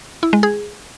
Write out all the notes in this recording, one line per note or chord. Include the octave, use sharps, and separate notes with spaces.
E4
G#3
G#4